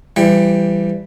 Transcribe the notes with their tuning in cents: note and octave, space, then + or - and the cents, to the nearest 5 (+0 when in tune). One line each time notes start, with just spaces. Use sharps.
E3 +35 G3 +10 G5 +15